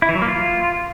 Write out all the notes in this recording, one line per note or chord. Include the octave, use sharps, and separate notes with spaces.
E4
E3
F#3
A#3
F4